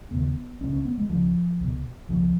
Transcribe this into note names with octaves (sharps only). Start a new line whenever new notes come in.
D#2 C#3 B3
C#2 C#3 C#4
C#4
B3
G#3
C#2 C#3 F3
C#2 B2
C#2 B2 F3